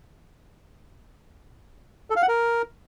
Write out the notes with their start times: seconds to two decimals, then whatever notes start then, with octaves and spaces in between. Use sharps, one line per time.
2.10 A4
2.16 F5
2.22 F#5
2.28 A#4